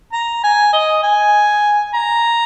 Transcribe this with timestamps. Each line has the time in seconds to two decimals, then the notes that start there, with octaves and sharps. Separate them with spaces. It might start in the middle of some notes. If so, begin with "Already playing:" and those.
0.13 A#5
0.43 G#5
0.73 D#5
1.03 G#5
1.94 A#5